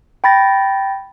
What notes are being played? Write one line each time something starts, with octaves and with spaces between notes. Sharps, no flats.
G5 B5 A6 A#6